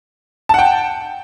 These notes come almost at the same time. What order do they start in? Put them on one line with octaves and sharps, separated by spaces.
A5 F#5 G5